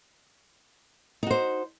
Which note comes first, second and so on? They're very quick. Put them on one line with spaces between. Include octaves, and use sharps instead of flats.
D#4 F#4 C5